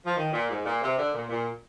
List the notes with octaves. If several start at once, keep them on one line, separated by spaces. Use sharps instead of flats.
F3
D#3
A#2
G#2
A#2
C3
D3
A#2
A#2